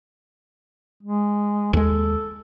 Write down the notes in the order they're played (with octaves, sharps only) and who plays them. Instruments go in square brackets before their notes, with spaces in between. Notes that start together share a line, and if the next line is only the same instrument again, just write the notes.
[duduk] G#3
[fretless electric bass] D#2 G#3 [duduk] A4